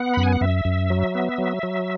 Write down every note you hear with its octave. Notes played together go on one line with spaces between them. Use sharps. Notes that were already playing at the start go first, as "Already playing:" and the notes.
Already playing: B3 F#5
F#2 B5
G#5
F#5
F#2 E5
F#2
F#3
B3
F#3
F#3